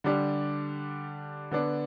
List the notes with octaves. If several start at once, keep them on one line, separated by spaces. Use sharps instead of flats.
D3 G3 D4 G4
D3 B3 D4